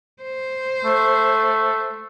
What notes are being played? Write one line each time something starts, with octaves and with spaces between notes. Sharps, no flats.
C5
A3